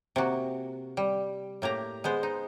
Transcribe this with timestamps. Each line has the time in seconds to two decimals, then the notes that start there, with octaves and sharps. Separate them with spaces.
0.16 C3 A#3 F#4
0.97 G3
1.62 A2 A#3 G4 A#5
2.04 G#3 B3 C5
2.23 D#4